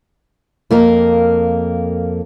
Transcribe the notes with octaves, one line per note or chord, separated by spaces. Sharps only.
F2 A#3 A#4